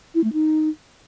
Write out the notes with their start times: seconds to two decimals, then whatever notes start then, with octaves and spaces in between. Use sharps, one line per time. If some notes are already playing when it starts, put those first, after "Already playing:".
0.15 E4
0.24 A3
0.33 D#4